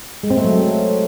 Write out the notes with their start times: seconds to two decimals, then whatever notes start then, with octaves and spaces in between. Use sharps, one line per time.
0.23 G#3
0.30 C4
0.37 A3
0.44 F#3